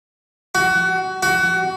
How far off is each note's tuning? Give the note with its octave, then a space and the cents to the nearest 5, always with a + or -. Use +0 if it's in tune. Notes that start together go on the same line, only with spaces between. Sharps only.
F#4 +25
F#4 +25